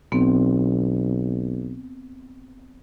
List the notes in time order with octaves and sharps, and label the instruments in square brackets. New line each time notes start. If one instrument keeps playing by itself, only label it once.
[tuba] B1 [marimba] B3 C4